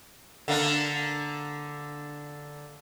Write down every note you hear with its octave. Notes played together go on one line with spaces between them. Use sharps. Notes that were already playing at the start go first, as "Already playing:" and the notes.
D3 A#3 D4